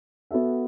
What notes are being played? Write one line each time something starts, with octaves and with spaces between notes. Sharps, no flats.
B3 F#4 A4 E5